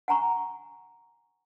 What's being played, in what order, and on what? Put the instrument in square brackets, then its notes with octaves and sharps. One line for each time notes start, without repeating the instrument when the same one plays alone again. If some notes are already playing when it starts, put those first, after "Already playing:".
[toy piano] F#5 G#5 A#5 C#6